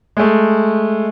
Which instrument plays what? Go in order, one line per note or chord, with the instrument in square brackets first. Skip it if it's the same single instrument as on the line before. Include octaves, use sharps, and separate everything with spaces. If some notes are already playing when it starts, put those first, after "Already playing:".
[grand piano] G#3 A3